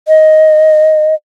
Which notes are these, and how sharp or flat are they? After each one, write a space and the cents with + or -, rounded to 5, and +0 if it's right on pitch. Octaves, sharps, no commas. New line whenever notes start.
D#5 +5